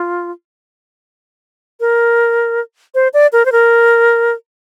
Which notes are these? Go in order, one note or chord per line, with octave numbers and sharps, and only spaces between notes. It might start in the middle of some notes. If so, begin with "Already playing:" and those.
Already playing: F4
A#4
C5
D5
A#4
C5
A#4